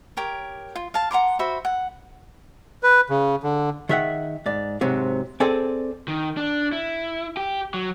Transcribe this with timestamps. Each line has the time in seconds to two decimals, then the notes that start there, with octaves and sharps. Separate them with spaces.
0.17 G4 A#4 C#5
0.75 F4
0.94 F5 A5
1.11 F#5 A#5 C6 D6
1.39 F#4 C5 E5 B5
1.65 F#5
2.83 B4
3.10 C#3
3.43 D3
3.89 D#3 G#4 E5 F#5
4.46 G#2 D5
4.81 G#2 C3 F#3
5.40 C4 G#4 A4 D5 G#5
6.08 D#3
6.37 D4
6.72 E4
7.37 G4
7.74 F#3